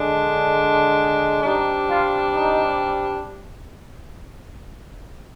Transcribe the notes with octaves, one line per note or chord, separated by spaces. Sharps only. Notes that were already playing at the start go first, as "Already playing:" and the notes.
Already playing: D3 G#3 D4
C3 G3 D4 D#4
F4
D#4